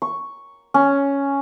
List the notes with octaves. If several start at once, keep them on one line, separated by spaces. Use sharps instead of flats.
C#6
C#4